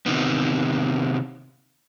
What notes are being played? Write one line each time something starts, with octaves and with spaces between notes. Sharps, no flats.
C3 D#3 B3